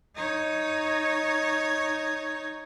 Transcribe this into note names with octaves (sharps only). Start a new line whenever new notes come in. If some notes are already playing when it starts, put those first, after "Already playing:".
D#4 C#5